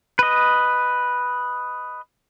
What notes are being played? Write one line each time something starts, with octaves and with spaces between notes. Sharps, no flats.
B4 D#5